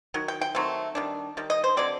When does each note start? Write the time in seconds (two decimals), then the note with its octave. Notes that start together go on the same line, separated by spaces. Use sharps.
0.14 D#3 F#3
0.28 G5
0.41 G5
0.55 D#3 F#3 A3 C4
0.95 D#3 G3 D4
1.37 D#3 G3
1.50 D#5
1.64 C5
1.77 D3 F#3 C4 D5